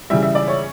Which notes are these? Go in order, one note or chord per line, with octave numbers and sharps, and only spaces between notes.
C#3 E3 G3 E5
E5
D5
C#5